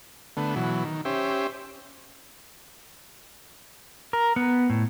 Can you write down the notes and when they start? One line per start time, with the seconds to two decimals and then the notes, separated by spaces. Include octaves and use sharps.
0.37 D3 A3 B3
0.56 B2 E3 F#3
0.85 D#3
1.05 C#4 G4 C5 E5
4.13 A#4
4.36 B3
4.70 A2